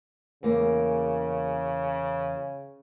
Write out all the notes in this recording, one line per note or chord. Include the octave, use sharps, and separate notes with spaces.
E2 C#3 A#3